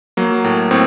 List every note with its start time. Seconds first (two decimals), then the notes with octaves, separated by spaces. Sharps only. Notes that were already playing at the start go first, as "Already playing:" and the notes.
0.17 F#3 A#3
0.44 A2
0.71 A2 C4